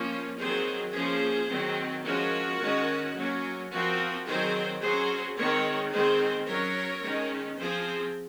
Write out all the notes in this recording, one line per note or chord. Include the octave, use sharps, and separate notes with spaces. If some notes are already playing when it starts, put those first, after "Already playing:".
Already playing: F3 A#3 C#4
D#3 F#3 C4 G#4 C5
F3 A#3 C#4 G#4 C5
D#3 F#3 C4
F3 G#3 C#4 F#4 A#4
D#3 G#3 C#4
F#3 A#3 C#4
F3 C4 F#4 A#4
D#3 F#3 C4 G#4 C5
F#3 C#4 G#4 C5
D#3 G#3 C4 A#4 C#5
D#3 G#3 C4 G#4 C5
F#3 C#4 A#4 C#5
D#3 G#3 C#4
F3 C4 G#4 C5